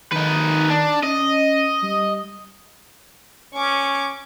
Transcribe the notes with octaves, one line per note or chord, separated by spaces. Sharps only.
D#3 D#4 B4
D4
C#4 D#5
G3
C#4 C#6 D6